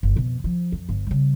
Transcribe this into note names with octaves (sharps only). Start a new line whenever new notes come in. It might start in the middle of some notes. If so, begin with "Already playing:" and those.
G1
F2 B2
F3
F2
G1
C#3 G3